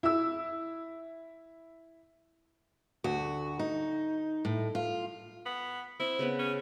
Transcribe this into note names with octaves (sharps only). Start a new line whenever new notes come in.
E4 E6
D2 F#4
D#4
A2
F4
B3
C4 E4
C#3 B3 B4
C#4